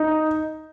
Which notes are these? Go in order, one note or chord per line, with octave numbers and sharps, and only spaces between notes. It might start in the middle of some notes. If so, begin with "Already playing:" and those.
Already playing: D#4